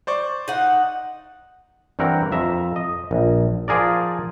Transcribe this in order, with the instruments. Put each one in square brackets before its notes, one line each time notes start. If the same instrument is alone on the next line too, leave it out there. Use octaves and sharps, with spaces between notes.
[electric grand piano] C5 D5 C#6
[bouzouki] D#4 F#5
[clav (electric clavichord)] G2 E3 C4 A#4 F#5
F2 E5 A#5
D#5
A#1
F3 F4 G#4 A#4 D5